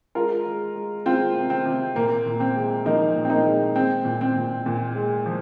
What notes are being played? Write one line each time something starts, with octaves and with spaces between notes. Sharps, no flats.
G#3 F4 A#4
G#3
G#3
G#3 C4 F4
C3
C4
C3
A#2 A#3
A#2
C4
G#3
F3 A#3 D#4
A#2
C4
A#3 D#4
G#3
G#3 C4
A#2
C4
A#2
A#2
G#3
F3